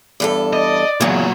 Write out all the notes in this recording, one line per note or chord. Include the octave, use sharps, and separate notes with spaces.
E2 G2 A4
D5 D#5
E2 A#2 C#3 F#3